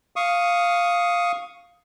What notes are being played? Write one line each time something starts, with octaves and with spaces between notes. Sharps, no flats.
F5 C#6 D#6